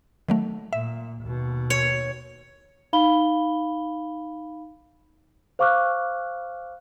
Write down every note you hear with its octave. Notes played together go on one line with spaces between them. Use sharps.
D#3 F#3 A3
A#2 E5
D#2 B2
C#5
D#4 F5 B5 G7
C5 F5 C#6 D6 F6 F#6